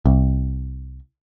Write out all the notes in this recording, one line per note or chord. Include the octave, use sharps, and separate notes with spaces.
C2